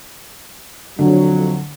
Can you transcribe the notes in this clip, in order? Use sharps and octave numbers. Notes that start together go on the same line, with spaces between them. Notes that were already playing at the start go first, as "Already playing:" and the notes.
F2 D3 F#3